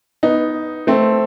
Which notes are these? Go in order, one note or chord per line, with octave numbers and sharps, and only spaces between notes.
B3 D#4
A3 C4